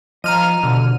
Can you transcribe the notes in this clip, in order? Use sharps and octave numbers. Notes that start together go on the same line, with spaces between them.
F3 D#5 A#5 F6 D#7
B2 D3